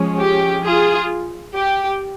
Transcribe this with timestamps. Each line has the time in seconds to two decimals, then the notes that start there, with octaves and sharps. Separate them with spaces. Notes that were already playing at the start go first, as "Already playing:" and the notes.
Already playing: F3 G#3 C#4
0.20 G4
0.65 F4 G#4
1.55 G4